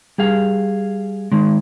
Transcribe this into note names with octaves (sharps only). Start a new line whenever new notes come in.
G3 G#4 F5
D#3 G#3